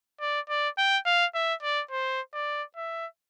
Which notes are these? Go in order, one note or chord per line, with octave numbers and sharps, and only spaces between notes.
D5
D5
G5
F5
E5
D5
C5
D5
E5